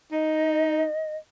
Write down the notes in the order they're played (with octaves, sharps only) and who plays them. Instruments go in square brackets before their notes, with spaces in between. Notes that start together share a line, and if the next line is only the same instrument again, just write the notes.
[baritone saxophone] D#4 [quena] D#5